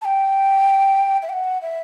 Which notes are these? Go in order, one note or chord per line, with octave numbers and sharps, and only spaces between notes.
A5
G5
E5
G5
F#5
E5